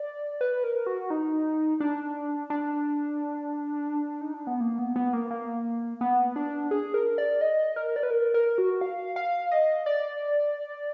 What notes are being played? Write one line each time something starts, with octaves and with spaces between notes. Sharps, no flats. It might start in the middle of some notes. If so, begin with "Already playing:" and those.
Already playing: D5
B4
A#4
F#4
D#4
D4
D4
D#4
D4
B3
A#3
B3
B3
A#3
A#3
B3
D4
G#4
A#4
D5
D#5
A#4
D5
B4
A#4
A#4
F#4
F5
F5
D#5
D5